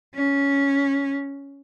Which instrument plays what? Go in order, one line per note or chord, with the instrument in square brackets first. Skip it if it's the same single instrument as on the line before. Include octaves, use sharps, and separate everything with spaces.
[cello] C#4